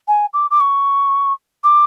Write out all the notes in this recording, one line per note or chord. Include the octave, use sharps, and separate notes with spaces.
G#5
D6
D6
C#6
D6